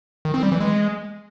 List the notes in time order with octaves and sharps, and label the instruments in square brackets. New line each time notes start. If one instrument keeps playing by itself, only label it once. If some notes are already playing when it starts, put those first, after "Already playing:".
[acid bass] D#3
C4
G3
E3
G#3